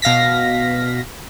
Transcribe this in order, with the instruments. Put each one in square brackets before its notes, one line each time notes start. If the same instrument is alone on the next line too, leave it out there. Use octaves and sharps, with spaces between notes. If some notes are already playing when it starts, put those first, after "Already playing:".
[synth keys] B2 F5 A#6 B6